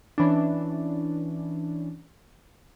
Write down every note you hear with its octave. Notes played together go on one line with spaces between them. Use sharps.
E3 C#4 D4